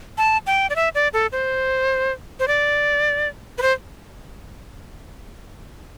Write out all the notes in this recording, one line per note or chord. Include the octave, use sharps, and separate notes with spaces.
A5
G5
D5
E5
D5
A4
C5
C5
D5
B4
C5